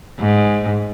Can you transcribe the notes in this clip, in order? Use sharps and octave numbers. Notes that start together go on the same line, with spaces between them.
G#2